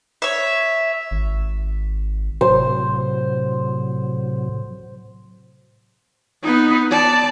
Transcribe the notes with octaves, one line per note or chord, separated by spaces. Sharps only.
C#5 E5
G#1
A2 C3 F#3 C5
B3 D#4
D5 A5